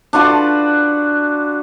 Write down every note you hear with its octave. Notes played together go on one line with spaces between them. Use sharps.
D4 F4 F#4 B4